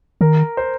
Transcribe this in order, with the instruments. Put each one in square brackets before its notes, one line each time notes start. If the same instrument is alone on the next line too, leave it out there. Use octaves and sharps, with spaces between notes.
[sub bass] D#3 [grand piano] A#4
[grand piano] C5